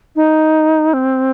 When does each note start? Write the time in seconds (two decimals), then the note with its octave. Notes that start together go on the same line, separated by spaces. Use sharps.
0.16 D#4
0.93 C4